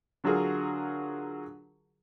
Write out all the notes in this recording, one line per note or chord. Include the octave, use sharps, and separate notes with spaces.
D3 F#3 F4 F#4 G#4 A#4